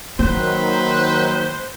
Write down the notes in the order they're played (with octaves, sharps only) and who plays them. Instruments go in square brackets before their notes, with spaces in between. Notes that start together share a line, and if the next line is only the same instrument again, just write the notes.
[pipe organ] D#3 F#3 [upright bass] A#3 [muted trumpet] B4 [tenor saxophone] C5